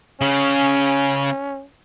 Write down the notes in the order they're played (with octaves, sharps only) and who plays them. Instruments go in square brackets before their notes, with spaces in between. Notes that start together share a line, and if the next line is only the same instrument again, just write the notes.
[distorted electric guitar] C#3 [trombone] C#4